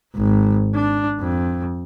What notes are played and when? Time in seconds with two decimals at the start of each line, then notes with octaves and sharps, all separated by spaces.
0.16 G#1
0.75 D4
1.21 F2